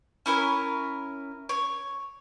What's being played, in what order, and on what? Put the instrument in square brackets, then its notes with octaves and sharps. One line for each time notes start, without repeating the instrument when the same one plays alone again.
[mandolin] C#4 E4 A#4 G#5
C#5